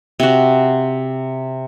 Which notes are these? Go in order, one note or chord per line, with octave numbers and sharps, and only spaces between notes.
C3 F#4